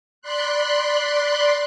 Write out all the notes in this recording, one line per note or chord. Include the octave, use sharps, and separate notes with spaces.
D5 B5 C6 F#6